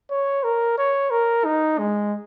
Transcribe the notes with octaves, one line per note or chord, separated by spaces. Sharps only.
C#5
A#4
C#5
A#4
D#4
G#3